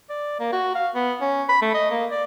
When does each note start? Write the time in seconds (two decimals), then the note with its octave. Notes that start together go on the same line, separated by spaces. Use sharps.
0.10 D5
0.40 A#3
0.52 F#4
0.75 F5
0.95 B3
1.21 C#4
1.49 B5
1.62 A3
1.74 D#5
1.91 A#3
2.11 D5